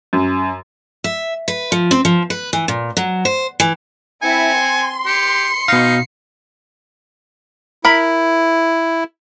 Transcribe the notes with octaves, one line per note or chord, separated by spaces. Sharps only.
F#2
E5
B4
F3
C4
F3
B4
E3
A#2
F#3
C5
E3
C4 E4 G#5 C#7
C6
G4 C7 C#7
B2 D#4 F5
E4 A#4 B5